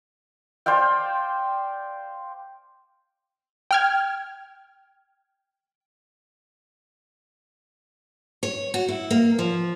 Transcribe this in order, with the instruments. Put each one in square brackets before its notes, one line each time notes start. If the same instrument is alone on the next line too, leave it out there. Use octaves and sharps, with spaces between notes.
[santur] C5 D5 F5 G5
[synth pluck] G5 F6 G#6
[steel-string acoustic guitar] C#5
F#4
E4
A#3
F3